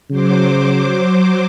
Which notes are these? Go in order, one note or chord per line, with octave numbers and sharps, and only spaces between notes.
C#3 F#3 C5 D6